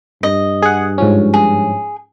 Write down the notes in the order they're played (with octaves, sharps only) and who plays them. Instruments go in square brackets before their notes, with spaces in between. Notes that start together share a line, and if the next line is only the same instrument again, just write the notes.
[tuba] G2 [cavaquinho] D#5
[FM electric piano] G#4 F#5
G#2 F3 C#4
[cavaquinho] G#4